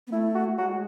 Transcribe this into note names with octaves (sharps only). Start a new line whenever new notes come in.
B3
A3 E4
F#4
G#3 F#4